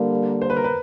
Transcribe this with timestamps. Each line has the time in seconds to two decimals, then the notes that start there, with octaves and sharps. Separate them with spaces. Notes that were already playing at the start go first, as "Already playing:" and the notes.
Already playing: D3 G3 A#3
0.42 C5
0.50 B4
0.56 A#4
0.64 B4